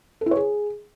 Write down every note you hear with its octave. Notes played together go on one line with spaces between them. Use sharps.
A4
E4
C#5
G#4